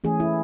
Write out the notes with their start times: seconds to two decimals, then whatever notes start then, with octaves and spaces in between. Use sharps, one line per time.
0.04 E3 A3 C#4 G#4
0.20 E4